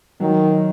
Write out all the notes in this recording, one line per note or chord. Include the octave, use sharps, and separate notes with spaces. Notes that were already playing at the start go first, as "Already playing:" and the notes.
D#3 F#3